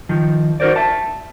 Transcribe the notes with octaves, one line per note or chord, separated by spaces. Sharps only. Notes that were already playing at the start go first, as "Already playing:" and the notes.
D#3 F3
D#4 F#4 A#4 C5 D5
E5 A5